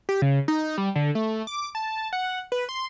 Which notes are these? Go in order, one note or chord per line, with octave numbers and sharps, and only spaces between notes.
G4
C#3
D#4
G3
D3
A3
D6
A5
F#5
B4
C6